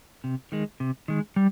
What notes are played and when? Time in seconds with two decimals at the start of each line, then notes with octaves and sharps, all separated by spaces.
0.24 C3
0.52 D#3 G#3
0.80 C3
1.08 D#3 G#3
1.36 G3